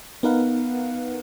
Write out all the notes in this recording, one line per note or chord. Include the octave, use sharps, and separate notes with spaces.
B3 D#4 A#4 B4 F5 F#5